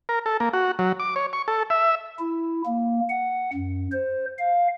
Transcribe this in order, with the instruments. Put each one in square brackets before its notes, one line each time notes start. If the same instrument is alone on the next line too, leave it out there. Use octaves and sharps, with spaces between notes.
[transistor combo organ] A#4
A4
A#3
F#4
F#3
D6
C#5
C#6
A4
E5
[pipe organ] E4
A#3
F#5
F#2
C5
F5